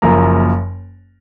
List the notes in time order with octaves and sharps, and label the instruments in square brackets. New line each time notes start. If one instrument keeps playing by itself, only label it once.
[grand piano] F#1 F#2 F3 A#3 A#5